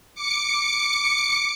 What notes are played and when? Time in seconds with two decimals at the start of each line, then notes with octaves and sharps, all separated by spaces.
0.15 D6 C#7